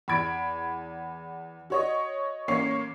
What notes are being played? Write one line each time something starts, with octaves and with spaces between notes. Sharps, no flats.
E2 B5 G#6 D7
F#4 C#5 D#5
A1 A#3 C#4 C#5 C7